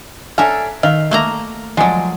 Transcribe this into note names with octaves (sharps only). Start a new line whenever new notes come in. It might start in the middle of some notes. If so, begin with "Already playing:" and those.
C#4 D4 A4 E5 A#5
D#3 E5 F5
A3 A#3 A#5
F3 F#3 G#3 D5